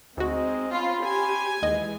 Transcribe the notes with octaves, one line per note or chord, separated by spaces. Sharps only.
D2 G#3 C4 D#4 F#4 D#5
C#4 F4 B5 C6
G4 G#5
D#2 E3 G#3 D#5